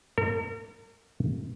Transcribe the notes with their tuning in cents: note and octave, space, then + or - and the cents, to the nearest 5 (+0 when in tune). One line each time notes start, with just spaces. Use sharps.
A#4 -40